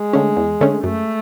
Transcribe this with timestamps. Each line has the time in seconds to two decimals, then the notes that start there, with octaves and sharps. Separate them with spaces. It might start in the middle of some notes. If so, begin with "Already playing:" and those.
Already playing: G#3
0.13 D3 A3 C#4
0.37 E2
0.61 D3 A3 C#4
0.83 F#2 A3